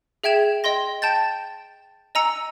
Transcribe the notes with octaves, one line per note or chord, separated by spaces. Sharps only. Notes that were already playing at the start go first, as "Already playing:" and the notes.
G#4 E5 G5 G#6 E7
D#5 G5 C6 A#6
G5 A5 G6 A6
D#5 G#5 A#5 E6 C#7